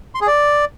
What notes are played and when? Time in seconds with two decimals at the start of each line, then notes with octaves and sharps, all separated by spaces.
0.15 C6
0.21 G#4
0.27 D5